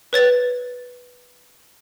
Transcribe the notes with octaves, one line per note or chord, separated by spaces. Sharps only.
B4 C#5 A6